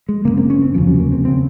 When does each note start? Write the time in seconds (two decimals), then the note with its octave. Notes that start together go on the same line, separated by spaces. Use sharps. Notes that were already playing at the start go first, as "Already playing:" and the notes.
0.09 G#3
0.25 F#1 F2 C#3 A#3
0.37 C4
0.50 C#4
0.62 C4
0.74 F1 D#2 C#3 F3
0.87 F#3
0.99 A#3
1.12 C4
1.25 C#3 C4